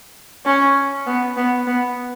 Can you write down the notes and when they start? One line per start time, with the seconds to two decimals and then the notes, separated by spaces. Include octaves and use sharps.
0.45 C#4
1.06 B3
1.37 B3
1.67 B3